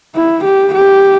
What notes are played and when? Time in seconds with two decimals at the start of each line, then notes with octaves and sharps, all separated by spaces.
0.15 E4
0.45 G4
0.75 G4